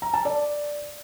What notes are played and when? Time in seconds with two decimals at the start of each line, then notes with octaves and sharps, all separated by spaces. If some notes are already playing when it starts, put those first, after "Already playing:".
0.02 A#5
0.14 A5
0.25 D5